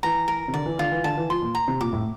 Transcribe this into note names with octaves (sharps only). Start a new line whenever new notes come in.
E3 A#5
A#4
C3
D3 D5
E3
D3 F4
E3
D3 A5
E3
F3 C6
A#2
A#5
C3
A#2 D6
A2